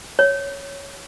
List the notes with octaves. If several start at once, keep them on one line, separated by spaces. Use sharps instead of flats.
C#5